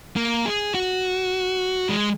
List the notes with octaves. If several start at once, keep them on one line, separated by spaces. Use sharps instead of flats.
A#3
G#4
F#4
G#3